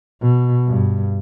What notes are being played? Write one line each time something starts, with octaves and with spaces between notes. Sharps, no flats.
B2
G2